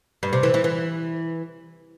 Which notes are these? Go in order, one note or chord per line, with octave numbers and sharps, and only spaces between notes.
G2
C3
E3
E3
E3